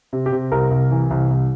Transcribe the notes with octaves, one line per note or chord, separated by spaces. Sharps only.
C3
G4
C3
C2 A#4
C2
E3
C2
C2